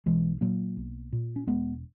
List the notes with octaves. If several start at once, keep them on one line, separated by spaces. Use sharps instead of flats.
B1 E3 G#3
A#2 F#3 A#3
B1
A#2
C#4
E1 G#3 B3